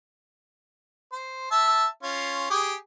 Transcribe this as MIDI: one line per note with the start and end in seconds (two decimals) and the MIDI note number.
1.12 1.47 72
1.51 1.86 76
1.51 1.86 81
1.51 1.86 88
2.03 2.49 61
2.03 2.49 65
2.50 2.74 67
2.50 2.74 68